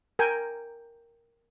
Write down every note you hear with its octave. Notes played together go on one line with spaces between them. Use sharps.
A#4 G5 G#5